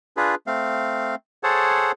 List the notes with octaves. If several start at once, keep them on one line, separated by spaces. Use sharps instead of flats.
D4 F4 G#4 B4
A3 C4 F5
G#4 A4 C5 C#5 F#5 A5